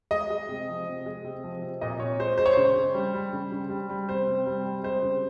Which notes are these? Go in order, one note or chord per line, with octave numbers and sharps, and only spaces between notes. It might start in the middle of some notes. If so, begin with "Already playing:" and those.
G#3 D#5
G#3
C3
F3
C3
G#3
C3
F3
C3
A#2 D#5
A#2 C#5
G#3 C5
G#3 C5
C#5
C#3 C5
C#3
G3
G3
C#3
C#3
G3
G3
C3 C5
C3
G3
G3
G#3 C5
C#3